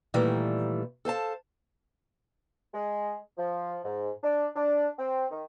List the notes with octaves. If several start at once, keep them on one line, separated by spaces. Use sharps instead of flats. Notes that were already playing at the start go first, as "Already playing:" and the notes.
A#2 D#3 E3 G3 A3
A4 C5 F5 A5
G#3
F3
G#2
D4
D4
C4
D#3